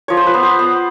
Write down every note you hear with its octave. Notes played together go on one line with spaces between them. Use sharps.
F3 C#5
C5
B4
B3
C5
B3